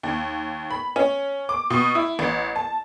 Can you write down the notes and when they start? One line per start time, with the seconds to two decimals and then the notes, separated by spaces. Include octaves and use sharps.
0.03 D#2
0.71 B5
0.96 C#4
1.49 D6
1.70 B2
1.95 E4
2.19 A1
2.56 A5